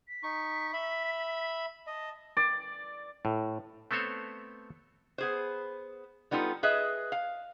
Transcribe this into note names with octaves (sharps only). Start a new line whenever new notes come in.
B6
D#4 C#6
E5 B5
D#5 A5
D5
A2
A3 B3 C4 A4 C5 C#5
B3 G#4 C5
G3 B3 D#4 F4 A4
G#4 B4 D#5 E5
F5